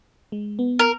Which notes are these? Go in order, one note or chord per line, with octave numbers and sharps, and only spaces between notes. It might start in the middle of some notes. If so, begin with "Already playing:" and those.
G#3
B3
A#4